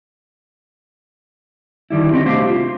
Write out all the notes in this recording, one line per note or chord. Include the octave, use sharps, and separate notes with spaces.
D3 D#3 G3 E4
C4 C#4 G4 D#5
C2 A3 D4 G4 C5 F5
F4